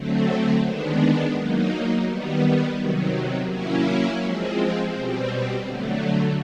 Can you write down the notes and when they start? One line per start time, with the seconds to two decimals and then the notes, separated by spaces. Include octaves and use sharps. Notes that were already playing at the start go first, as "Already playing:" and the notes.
Already playing: D3 F#3 A3 C4
0.64 D#3 G#3 B3 D4
1.36 F#3 A#3 D#4
2.08 D#3 G3 B3
2.79 C3 D#3 F#3
3.50 F#3 A#3 C#4 E4
4.22 F3 G#3 C4
4.93 B2 G3 C4
5.65 D3 F#3 A3